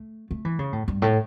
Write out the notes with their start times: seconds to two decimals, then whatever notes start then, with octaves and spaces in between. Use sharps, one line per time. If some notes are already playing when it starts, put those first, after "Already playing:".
Already playing: A3
0.31 A3
0.45 E3
0.59 C#3
0.73 A2
0.88 G2
1.02 A2